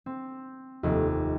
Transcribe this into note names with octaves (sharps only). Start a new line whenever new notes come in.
C4
F1 D#2